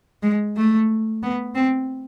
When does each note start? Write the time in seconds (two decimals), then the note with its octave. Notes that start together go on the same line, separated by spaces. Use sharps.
0.23 G#3
0.56 A3
1.23 B3
1.55 C4